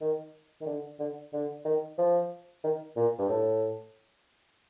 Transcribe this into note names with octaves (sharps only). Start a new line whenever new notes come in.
D#3
D#3
D3
D3
D3
D#3
F3
D#3
A#2
G2
A2